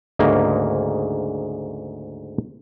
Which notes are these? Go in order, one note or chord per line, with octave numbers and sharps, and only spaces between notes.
D2 G#2 C#3 A#3